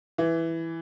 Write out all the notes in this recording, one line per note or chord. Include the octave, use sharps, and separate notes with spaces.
E3